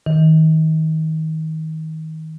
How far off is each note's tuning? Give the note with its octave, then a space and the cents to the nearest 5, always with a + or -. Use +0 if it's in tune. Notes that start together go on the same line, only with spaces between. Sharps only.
D#3 +30